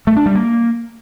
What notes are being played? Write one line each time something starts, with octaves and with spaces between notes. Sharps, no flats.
A3
D4
G3
A#3